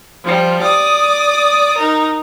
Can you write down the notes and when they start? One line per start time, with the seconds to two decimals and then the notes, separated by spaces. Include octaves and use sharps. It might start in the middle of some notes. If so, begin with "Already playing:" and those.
0.24 F3 G3
0.63 D5 D#6
1.76 D#4 A#4